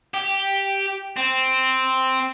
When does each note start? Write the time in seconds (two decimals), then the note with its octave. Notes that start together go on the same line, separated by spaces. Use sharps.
0.14 G4
1.17 C4